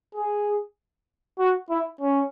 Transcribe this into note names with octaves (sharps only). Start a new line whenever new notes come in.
G#4
F#4
E4
C#4